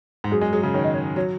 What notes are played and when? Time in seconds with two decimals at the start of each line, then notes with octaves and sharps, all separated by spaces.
0.24 G#2
0.31 F#2 G#4
0.41 G#3
0.53 F#3 G#4
0.63 C#3
0.74 D#3 C#5
0.84 D#5
0.94 C#5
1.16 F#3 C#5